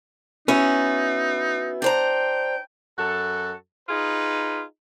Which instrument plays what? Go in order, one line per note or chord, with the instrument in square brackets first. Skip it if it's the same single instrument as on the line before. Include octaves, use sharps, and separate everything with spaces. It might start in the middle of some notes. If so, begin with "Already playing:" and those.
[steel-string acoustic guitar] B3 E4 F#4 [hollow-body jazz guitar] C#4 [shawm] D#4
[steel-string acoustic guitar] D4 C5 A#5 [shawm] G5
[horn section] F#2 F#4 A4
D#4 F4 G#4 B4